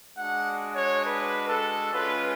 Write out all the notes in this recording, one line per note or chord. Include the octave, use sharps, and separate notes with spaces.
G#3 D4 F#4 F#5
C#5
B4
A4
G#3 C#4 F4 B4